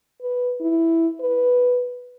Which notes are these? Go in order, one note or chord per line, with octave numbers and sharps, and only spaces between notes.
B4
E4
B4